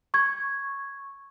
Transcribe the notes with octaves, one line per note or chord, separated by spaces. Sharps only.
C#6 G#6